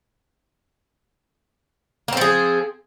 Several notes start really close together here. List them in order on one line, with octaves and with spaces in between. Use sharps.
A#3 C4 F3 G#4